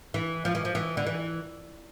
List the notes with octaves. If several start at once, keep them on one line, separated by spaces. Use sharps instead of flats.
E3
F3
E3
F3
E3
D3
E3